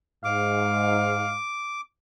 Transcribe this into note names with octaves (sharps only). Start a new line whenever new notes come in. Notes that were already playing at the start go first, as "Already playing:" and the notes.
G#2 F5 D6